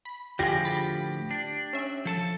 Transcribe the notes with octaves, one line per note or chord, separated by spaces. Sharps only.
B5
D2 A2 F3 F4 G4 G#4 A#6
B5 A6 B6
D4
C#4 E5
F3 A4 A5